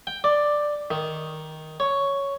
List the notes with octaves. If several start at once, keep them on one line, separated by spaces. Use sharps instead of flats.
G5
D5
D#3
C#5